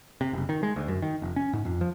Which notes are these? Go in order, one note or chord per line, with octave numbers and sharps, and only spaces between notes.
C3
F#1
D#3
G#3
D2
F#2
D#3
F1
C#4
G#2
F2
F3